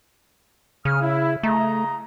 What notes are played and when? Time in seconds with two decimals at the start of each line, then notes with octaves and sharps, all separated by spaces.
0.85 C#3 D#6 F6
1.01 E4
1.43 C#3 A3 D#5 A#5